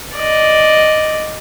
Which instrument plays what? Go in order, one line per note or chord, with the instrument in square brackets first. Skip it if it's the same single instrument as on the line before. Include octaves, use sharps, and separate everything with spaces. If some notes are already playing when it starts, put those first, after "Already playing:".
[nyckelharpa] D5 D#5